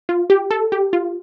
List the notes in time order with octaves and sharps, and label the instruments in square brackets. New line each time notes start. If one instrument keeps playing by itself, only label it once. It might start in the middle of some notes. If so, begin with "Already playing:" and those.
[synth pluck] F4
G4
A4
G4
F4